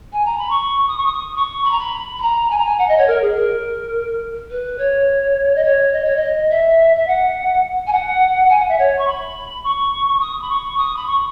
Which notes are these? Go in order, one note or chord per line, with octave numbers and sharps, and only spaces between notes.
G#5
A#5
B5
C#6
D#6
C#6
D#6
C#6
B5
A#5
B5
B5
A#5
G#5
A#5
G#5
F#5
D#5
C#5
A#4
G#4
A#4
B4
C#5
D#5
C#5
D#5
C#5
D#5
E5
E5
F#5
G#5
F#5
G#5
F#5
E5
C#5
C#6
B5
C#6
D#6
B5
C#6
D#6
B5
C#6